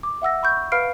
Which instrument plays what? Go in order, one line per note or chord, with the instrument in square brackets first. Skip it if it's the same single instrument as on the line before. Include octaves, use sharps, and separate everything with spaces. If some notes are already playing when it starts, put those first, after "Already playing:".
[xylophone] D6
E5 F#5 E6 A#6
B5 C#6 G6
B4 F5 B5 F6 C7 D7